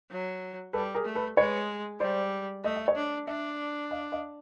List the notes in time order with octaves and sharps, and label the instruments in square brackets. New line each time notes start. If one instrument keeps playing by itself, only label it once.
[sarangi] F#3
[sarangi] G3 [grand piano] A4 B4
[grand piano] G#4 A#4
[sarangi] A3
[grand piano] A4 B4
[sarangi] G#3 [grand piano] B4 C#5
[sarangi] G3 [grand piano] C5 D5
[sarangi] A3 [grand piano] D#5
[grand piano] E5
C#5 D#5
[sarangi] D4
[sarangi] D4 [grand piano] D5 E5
[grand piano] D#5 F5
D#5 F5